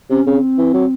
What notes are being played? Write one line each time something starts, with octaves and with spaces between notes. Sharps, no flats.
C3 C#4
C#3 C4
E3
F#3